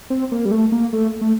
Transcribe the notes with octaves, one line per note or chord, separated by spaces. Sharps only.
C4
A#3
G3
A3
A#3
A3
A3